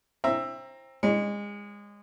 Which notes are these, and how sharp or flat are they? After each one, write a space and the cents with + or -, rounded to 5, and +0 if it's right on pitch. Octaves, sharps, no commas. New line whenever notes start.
C4 +25 E5 +10 A#5 +0
G#3 -25 C#4 +0